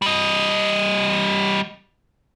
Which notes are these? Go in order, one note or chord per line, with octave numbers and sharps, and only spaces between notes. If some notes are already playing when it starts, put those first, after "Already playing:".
G3 D#5